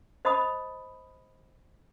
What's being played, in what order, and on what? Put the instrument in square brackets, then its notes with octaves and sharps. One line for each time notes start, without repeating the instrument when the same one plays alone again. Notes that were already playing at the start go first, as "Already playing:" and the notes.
[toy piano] C5 D#5 A5 B5 D#6